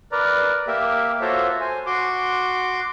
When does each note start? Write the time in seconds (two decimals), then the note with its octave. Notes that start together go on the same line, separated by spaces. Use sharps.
0.12 A#4 B4 D5 A#5
0.67 A#3 G4 A#4 E5
1.21 F4 F#4 A4 C5 C#5 E5
1.61 C5 G#5
1.86 F#4 C6 D6